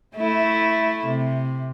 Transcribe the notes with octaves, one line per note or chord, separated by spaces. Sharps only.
A3 E4
C3